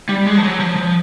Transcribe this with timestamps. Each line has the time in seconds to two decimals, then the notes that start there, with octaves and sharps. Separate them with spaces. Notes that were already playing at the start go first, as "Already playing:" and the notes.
0.09 G3
0.26 G#3
0.37 F3
0.43 F#3
0.60 F3
0.76 F3